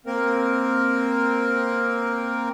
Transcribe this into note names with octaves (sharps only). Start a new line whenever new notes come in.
A#3 C4 A#4